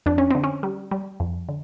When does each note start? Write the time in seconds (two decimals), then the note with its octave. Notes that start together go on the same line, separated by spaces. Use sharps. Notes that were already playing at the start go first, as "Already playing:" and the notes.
0.06 F2 D4
0.18 C#4
0.31 D3 C4
0.44 C#4
0.63 G3
0.91 G3
1.20 F2
1.49 D3